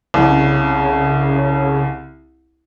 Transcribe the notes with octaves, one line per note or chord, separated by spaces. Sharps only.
C2 C#3